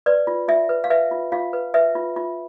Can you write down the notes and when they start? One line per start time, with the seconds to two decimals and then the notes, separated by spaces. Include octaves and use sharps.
0.06 B4 D5
0.27 F4
0.48 F4 E5
0.69 B4
0.84 F5
0.90 B4 E5
1.11 F4
1.32 F4 F5
1.53 B4
1.74 B4 E5
1.95 F4
2.16 F4